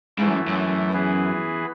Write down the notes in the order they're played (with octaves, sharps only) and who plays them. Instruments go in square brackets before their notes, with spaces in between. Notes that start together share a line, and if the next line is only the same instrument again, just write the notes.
[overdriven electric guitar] G#2 [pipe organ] E3 A3 E4
[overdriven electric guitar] F#2
F#2
[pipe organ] E3 B3 E4 G#4 B4